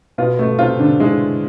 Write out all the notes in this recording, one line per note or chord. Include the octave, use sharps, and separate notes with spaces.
B2 B3 F4
A3
C3 C4 F4
D3 D4
E3 G#3 E4